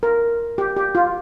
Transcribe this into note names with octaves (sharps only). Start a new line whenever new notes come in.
A#4
G4
G4
F4